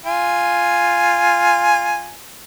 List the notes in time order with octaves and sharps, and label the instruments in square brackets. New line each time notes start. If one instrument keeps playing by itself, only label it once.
[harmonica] F4 G#5